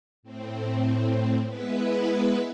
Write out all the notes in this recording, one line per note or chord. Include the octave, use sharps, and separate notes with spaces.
A2 C4
G#3 B3 E4 B4